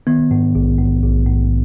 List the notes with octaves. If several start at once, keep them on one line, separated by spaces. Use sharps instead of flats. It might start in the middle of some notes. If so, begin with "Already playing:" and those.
D#3 B3
G#2
A#1
G#2
A#1
G#2